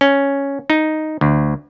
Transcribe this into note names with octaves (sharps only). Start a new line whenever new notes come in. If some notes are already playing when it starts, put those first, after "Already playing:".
C#4
D#4
D2